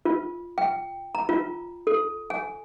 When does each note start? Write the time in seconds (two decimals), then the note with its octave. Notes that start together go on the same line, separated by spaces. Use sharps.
0.05 F4
0.58 G5
1.15 A#5
1.29 F4
1.87 A4
2.30 G#5